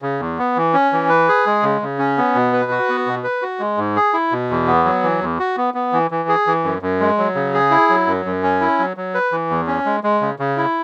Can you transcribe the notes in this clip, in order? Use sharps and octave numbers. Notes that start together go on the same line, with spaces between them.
C#3
E2
B3
E3
C#4
E3
B4
G#4
G#3
C#3
C#3
C#4
B3
B2
B4
F#4
B3
B2
B4
F#4
G#3
G#2
G#4
E4
B2
E2
B3
F#3
E3
E2
F#4
B3
B3
E3
E3
G#4
E3
F#2
F#2
G#3
F#3
C#3
G#4
E4
F#3
F#2
F#2
C#4
E4
F#3
F#3
B4
E3
E2
C#4
G#3
G#3
C#3
C#3
E4